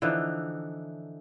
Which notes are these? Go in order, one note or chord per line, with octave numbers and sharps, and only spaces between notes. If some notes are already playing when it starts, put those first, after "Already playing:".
D3 E3 F3 D#4